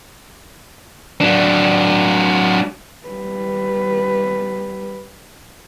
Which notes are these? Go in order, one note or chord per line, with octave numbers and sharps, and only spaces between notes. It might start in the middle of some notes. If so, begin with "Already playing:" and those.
F#3 D4
G3 B4